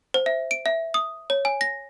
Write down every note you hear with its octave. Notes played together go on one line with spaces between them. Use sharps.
C5
E5
D7
E5
D#6
C#5
G#5
A#6